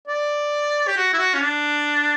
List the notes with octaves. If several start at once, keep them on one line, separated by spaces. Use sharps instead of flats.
D5
G4
F#4
E4
F#4
C#4
D4